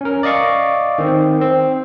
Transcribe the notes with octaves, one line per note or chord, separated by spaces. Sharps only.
C#4 A#4
D5 D#5 F5 C#6
D#3 C4
C4